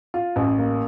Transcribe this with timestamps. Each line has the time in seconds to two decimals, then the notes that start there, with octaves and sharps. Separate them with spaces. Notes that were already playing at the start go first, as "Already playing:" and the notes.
0.14 F4
0.36 A1
0.58 A#3